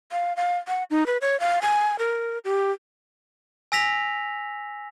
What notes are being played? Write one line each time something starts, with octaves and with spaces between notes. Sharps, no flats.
F5
F5
F#5
D#4
B4
C#5
F5
G#5
A#4
G4
G#5 E6 A#6 B6 F7